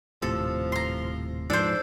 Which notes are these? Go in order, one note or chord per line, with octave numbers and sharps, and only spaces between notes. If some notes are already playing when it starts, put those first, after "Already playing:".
D#1 A2 C3 F3 A4
A#5 C6
G#2 F3 D4 A4 C5